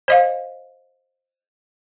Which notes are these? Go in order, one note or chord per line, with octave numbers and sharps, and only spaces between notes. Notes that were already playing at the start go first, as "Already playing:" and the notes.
C5 D#5 F5